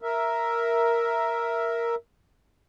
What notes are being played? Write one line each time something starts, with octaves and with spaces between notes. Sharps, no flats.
A#4 E5